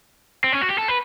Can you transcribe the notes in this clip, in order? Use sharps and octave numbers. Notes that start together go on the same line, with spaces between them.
C4
C#4
F#4
G4
A4
B4